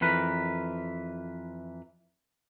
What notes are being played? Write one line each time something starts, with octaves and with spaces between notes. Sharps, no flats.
F2 E3 A#4 B4